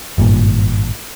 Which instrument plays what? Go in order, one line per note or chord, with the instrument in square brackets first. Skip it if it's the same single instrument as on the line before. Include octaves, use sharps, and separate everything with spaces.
[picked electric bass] G#1 G2 A#2